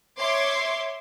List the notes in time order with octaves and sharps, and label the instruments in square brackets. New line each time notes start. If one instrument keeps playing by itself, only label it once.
[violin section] C#5 E5 C6 D6